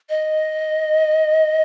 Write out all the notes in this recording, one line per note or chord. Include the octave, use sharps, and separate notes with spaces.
D#5